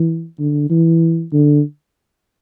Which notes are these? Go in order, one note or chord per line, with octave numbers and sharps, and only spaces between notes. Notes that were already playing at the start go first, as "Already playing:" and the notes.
Already playing: E3
D3
E3
D3